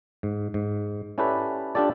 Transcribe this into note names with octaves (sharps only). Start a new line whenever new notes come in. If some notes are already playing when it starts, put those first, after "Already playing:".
G#2
G#2
C#4 E4 G4 A4 B4 D5
D4 F4 G4 A4 D5